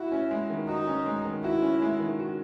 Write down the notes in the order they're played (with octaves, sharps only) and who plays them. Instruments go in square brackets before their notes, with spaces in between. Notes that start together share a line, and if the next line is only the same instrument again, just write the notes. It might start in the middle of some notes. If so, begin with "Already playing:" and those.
Already playing: [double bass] E4 [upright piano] F#4
[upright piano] C#4
G#3
D#3
[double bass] D#4 [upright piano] F#4
[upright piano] C#4
G#3
D#3
[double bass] E4 [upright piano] F#4
[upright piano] C#4
G#3
D#3
F#4